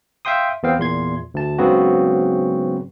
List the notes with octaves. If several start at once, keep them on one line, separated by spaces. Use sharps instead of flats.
E5 F5 G5 C6 D#6
E2 B3 C4 F5 G5
E2 A#2 C6 G#6
D2 A5
G#2 C#3 F#3 B3 C4 F#4